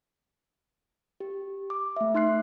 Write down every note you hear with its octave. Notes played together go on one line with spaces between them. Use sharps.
G4
D6
A3 E5
D#4 C6 F#6 C7